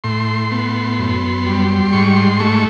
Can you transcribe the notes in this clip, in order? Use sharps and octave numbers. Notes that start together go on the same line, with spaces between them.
A2 C6
B3
F#2
G3
G#2 C#6
C6
A3 C#6